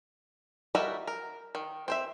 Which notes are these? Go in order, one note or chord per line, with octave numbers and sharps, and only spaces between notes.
G3 F#4 A#4 D#5 E5
A#4
D#3
C4 C5 E5